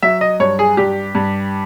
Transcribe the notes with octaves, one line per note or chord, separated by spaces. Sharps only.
F#3 E5
D#5
G2 C#5
G#4
G2 G4
G2